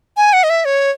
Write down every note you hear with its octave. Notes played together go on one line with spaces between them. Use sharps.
G#5
F#5
D#5
E5
C#5